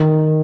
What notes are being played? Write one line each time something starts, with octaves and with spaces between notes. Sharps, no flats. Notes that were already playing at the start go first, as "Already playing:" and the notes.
Already playing: D#3